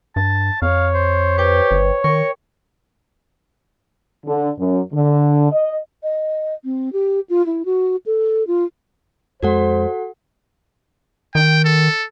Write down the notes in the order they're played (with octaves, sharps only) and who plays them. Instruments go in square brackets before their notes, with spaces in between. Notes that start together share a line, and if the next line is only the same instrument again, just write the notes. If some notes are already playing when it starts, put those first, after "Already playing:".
[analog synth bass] G2 [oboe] A5
[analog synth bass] F2 [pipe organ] C#5 [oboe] F5
[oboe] C5
[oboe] G4 [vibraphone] B4 C5 G5
[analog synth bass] G1
[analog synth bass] D#3 [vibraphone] A#4 G5 [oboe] C#6
[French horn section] D3
F#2
D3
D#5
[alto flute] D#5
C4
G4
F4
E4
F#4
A4
F4
[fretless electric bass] F2 G#3 [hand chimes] F#4 A4 F#5 [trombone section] C5
[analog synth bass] D#3 [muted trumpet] G5
[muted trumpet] A4